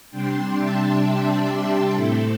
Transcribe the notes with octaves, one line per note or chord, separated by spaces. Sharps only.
C3 G3 D4 G5 C6
E5 A5
D5 G5
G4
A2 A3 C4 E4 A4